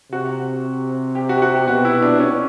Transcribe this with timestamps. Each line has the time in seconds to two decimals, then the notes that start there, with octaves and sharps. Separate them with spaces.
0.12 C3 F#4
1.15 G4
1.29 F#4
1.37 G4
1.42 F#4
1.55 G4
1.67 B2 F#4
1.85 E4
2.02 D4
2.19 C#4